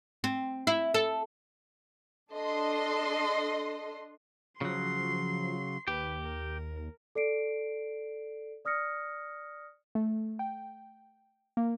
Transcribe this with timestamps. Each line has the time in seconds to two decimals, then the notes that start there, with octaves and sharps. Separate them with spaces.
0.24 C4
0.67 E4
0.94 A4
2.33 D4 A4 D#5 C6
4.61 C#3 F3 F#3 C6 C7
5.88 D#2 G4 B4
6.22 A#4
7.15 A4 D5 C7 D7
8.65 D5 D#6 F6 A#6 C#7
9.95 A3
10.39 G5
11.57 A#3